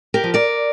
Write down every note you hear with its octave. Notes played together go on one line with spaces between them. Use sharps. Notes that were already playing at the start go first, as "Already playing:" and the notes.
G4 A#4
F3
A#4 D5